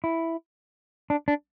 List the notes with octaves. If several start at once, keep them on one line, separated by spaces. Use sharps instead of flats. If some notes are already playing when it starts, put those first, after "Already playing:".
E4
D4
D4